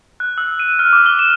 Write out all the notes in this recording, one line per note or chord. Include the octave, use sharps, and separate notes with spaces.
F#6
E6
D#7
F6
D6
G7
E7